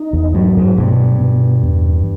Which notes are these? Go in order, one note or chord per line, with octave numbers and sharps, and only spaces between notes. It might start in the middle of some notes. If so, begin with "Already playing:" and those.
Already playing: D#4
E2
G2 F#3
G#2
G2 B2
B2
E2